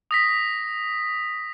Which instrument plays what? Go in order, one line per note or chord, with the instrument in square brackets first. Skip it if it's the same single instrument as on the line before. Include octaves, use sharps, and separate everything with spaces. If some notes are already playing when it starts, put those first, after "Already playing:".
[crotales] D#6 A#6 B6